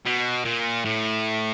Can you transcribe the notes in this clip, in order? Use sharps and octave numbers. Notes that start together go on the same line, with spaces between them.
B2
A#2
A2